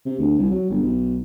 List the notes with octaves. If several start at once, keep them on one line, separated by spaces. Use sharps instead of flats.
C3
D2
C2
F#3
G1
B1